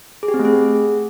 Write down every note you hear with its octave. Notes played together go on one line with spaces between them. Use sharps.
G#4
G4
C4
A3
G#4